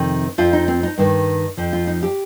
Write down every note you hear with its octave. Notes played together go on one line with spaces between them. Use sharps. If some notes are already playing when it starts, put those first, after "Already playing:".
Already playing: F2 C3 D#3
F2 F3 F4
D#4
C4
D#4
G2 D#3
F2 F3
F4
D#4
G4